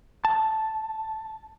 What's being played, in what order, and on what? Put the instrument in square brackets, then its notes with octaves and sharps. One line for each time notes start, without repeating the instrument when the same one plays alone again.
[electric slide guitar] A5